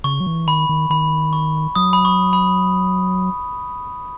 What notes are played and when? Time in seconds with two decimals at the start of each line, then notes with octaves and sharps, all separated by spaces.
0.04 C#3 C#6
0.20 F#3
0.27 E3
0.47 D#3 B5
0.69 D#3
0.90 D#3 B5
1.33 C#6
1.75 F#3 D#6
1.93 B5
2.05 C#6
2.33 B5